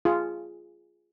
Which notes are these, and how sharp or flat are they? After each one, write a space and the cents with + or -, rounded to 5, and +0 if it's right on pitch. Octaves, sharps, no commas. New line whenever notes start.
F4 -10 G#4 +0